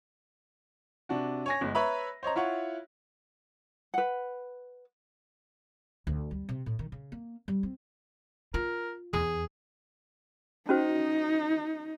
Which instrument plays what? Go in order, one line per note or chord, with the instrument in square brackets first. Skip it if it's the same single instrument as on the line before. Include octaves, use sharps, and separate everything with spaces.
[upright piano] C3 D4 F#4
C#5 G#5 A#6
G1 G#3
B4 C#5 E5 A#5 B5
C5 C#5 D#5 A#5
E4 F4 C#5 F#5
[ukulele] B4 F#5
[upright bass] D2
G3
C3
A2
D#3
C#3
A#3
G3
C4
[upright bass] F4 [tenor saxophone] A#4
[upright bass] E2 [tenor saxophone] G#4
[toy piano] C#4 F#4 C5 [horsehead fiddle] D#4